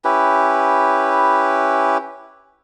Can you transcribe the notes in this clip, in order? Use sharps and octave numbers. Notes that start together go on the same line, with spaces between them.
C#4 E4 G4 B4